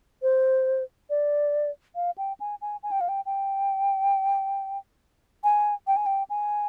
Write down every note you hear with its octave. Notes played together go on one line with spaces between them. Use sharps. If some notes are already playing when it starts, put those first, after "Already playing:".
C5
D5
F5
G5
G#5
G#5
G#5
G5
F5
G5
G5
G#5
G5
G#5
G5
G#5